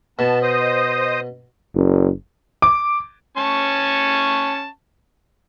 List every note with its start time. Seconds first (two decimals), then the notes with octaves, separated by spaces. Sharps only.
0.19 B2 B3 A5
0.42 C5 D#5 D#6
1.74 F#1
2.62 D6
3.37 C#4 A5 C#6